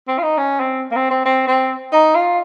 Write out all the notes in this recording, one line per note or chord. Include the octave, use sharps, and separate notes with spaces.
C4
F4
D#4
C#4
C4
A#3
C4
C4
C4
C4
D#4
F4